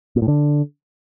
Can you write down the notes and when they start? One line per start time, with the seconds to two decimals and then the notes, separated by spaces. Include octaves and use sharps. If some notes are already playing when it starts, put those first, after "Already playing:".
0.16 A#2
0.22 A2
0.28 D3